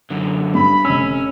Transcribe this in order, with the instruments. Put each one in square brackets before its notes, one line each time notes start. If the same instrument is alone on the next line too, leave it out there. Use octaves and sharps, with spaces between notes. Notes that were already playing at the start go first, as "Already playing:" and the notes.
[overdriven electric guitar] F#2 D3
[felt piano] G2 [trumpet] B5
[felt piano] F1 E6 [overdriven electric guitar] C#4